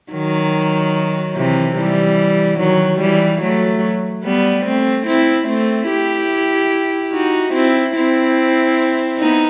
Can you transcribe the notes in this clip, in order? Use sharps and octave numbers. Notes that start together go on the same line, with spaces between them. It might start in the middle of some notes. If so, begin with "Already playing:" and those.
D#3 F#3
C3 E3
E3 G3
D#3 F#3
E3 G3
F#3 A3
G3 B3
A3 C4
C4 E4
A3 C4
E4 G4
D#4 F#4
C4 E4
C4 E4
B3 D#4